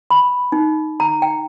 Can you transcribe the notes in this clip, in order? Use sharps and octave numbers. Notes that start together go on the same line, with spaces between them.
B5
D#4
A#5
G5